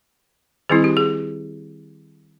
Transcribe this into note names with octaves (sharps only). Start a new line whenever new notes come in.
D#3 G3 C4 E4 G#4
G4
G#4